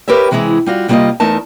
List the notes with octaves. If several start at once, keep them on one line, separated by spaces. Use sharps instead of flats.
G4 A#4 B4 C#5 E5
C3 E3 G#3 E4 G#4
G3 F4 F#4
C3 G3 A#3 D#4 F4 D#5
E2 A3 D#4 A#4 A5